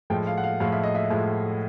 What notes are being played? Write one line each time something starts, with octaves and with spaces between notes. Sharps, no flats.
A2 F3 G#3 G5
F5
F#5
F5
A2 F3 G#3 F5
E5
D#5
E5
A2 F3 G#3